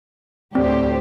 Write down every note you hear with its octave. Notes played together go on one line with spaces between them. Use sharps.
D2 A2 C4 G4 C5 D5